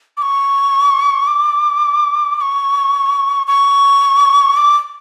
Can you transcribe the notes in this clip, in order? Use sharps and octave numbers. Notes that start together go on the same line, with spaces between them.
D6
C#6
D6
D6
C#6
C#6
D6